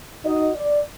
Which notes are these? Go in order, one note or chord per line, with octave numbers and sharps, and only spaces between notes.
D#4 F#4 D#5
D5